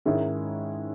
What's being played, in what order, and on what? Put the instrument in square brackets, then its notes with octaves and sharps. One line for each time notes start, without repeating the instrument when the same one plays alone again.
[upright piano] G#2 D#3 G#3 C#4 E4